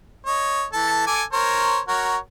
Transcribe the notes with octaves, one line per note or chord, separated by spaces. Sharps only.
C#5 D#5
E3 A4 A5
A4 G#5 D6
A#4 C5 C#5
F#4 A#4 C#5